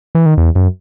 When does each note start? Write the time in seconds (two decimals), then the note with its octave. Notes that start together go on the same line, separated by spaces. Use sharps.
0.15 E3
0.26 D#3
0.38 E2
0.55 F#2